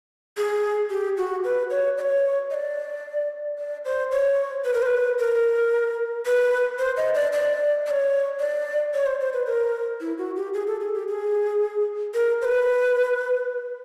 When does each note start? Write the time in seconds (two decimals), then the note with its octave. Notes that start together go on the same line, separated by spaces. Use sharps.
0.37 G#4
0.90 G4
1.17 F#4
1.44 B4
1.70 C#5
1.98 D5
2.01 C#5
2.51 D#5
2.54 D5
3.58 D5
3.85 C5
4.12 C#5
4.65 B4
4.74 A#4
4.82 C5
4.86 B4
5.19 A#4
6.26 B4
6.79 C5
6.97 D#5
7.15 D5
7.33 D5
7.86 D5
7.91 C#5
8.40 D5
8.94 C#5
9.06 C5
9.20 C5
9.33 B4
9.46 A#4
10.01 E4
10.18 F#4
10.36 G4
10.54 G#4
10.67 A4
10.81 G#4
10.94 G4
11.08 G#4
12.14 A#4
12.42 C5
12.45 B4